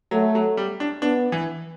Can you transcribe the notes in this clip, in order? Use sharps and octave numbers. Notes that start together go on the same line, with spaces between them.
F#3 A3
F#3
G3
D4
B3 D4
E3